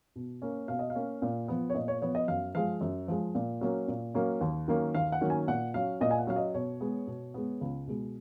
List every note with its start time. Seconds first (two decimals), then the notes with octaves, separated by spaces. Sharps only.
0.16 B2
0.42 A#3 C#4
0.68 B2 F5
0.79 D#5
0.90 F5
0.95 A#3 C#4
1.22 A#2
1.48 F3 B3
1.70 C#5
1.75 A#2 D#5
1.88 C#5
2.02 F3 B3 C#5
2.15 D#5
2.28 F#2 F5
2.55 F3 G#3 F5
2.81 F#2
3.08 F3 G#3
3.35 A#2
3.61 F#3 A#3 C#4
3.88 A#2
4.14 F#3 A#3 C#4
4.41 D#2
4.68 D#3 F#3 A#3 C#4
4.95 D#2 F5
5.12 F#5
5.21 D#3 F#3 A#3 C#4
5.30 G#5
5.48 A#2 F#5
5.74 F#3 C#4 F5
6.01 A#2 D#5
6.11 G#5
6.18 F#5
6.27 F#3 C#4 F5
6.36 D#5
6.54 B2 C#5
6.81 G#3 B3
7.08 B2
7.34 G#3 B3
7.61 C#2
7.87 B2 G#3